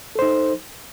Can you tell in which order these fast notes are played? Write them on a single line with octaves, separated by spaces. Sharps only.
A4 C5 D#4